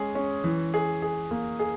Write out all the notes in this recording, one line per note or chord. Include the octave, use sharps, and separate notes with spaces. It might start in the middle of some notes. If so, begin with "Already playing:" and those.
Already playing: G#3 C#4 G#4
C#4
E3
G#4
G#4
A#3
G#4